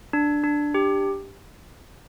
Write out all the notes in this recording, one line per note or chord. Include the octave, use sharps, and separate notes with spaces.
D4
D4
G4